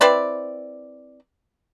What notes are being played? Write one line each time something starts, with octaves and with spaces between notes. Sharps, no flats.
C4 E4 B4 D5